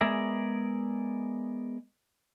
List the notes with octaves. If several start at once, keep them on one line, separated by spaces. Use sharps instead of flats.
G#3 B3 G#4 A#4 D5 E5